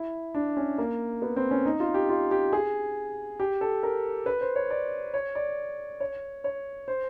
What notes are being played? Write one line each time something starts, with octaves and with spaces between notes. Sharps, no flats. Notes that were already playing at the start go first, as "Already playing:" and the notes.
Already playing: E4
D4
C#4
A#3
B3
C4
C#4
D#4
F4
G4
F4
G4
G#4
G4
A4
A#4
B4
C5
C#5
D5
C#5
D5
C#5
C#5
C5